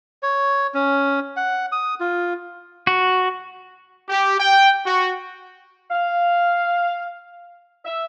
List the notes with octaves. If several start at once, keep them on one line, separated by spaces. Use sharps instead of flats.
C#5
C#4
F#5
D#6
F4
F#4
G4
G5
F#4
F5
E5